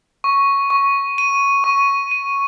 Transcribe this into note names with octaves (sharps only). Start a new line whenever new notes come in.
C#6
C#6
D#7
C#6
D#7